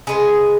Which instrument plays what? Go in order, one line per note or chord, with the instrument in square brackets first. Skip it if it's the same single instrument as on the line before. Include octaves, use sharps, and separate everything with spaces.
[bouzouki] C#3 G#3 B3 G#4